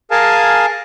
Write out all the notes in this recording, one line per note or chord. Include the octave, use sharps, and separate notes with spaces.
G#4 A#4 F5 G#5 A5